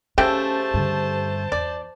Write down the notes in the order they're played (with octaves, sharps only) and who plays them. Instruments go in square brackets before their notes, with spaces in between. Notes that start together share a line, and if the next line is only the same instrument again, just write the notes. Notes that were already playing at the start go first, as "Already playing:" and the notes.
[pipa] C#3 A3 E5 [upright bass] C#4 [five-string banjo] G4 [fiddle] C5 A5
[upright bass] G2 D3
[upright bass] E2 [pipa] D5